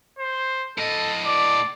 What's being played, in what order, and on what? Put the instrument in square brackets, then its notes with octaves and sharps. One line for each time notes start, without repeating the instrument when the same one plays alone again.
[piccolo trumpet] C5
[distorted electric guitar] A2 D#5 [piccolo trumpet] A4
[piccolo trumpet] D5